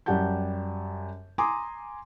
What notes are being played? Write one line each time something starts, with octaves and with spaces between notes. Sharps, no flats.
F#2 G3 G4 F#5 A5 G6
G#5 A#5 C6 D6 D#6